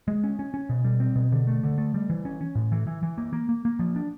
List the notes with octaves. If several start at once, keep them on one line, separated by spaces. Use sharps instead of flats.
G#3
C#4
C#4
C#4
B2
G3
C4
B2
D3
A3
D3
A3
G3
E3
C#4
C#4
A2
E3
E3
E3
A#3
A#3
A#3
A#3
F3
D4